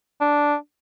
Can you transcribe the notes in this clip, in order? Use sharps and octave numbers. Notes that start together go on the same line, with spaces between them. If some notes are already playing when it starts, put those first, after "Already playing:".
D4